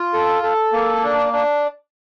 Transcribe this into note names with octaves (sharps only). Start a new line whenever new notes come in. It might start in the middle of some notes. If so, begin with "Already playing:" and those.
Already playing: F4
A4
A4
A#3
D4
D4